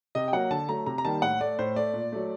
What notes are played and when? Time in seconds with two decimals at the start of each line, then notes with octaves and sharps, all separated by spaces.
0.15 C3 D#5
0.28 G5
0.33 F#3 A#3 F#5
0.51 D3 A5
0.69 F#3 A3 A#5
0.86 C3 A#5
0.98 A#5
1.05 D#3 G3 A#3 A5
1.22 A2 F#5
1.41 A3 D5
1.59 A2 C5
1.76 A3 D5
1.94 A#2
2.12 F#3 A3